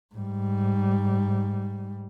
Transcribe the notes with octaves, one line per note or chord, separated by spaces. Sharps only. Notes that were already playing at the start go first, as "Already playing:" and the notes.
G#2 G3